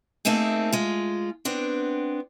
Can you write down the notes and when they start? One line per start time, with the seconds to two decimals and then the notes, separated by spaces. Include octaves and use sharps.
0.25 A3 A#3 C4 D#4 G#4
0.72 G#3 F4
1.45 B3 C4 D4